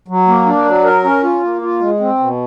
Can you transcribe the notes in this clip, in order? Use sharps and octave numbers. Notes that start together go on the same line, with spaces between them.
F#3
A#3
D4
F#3
A#4
C#4
F4
A#3
F4
G#3
C4
B2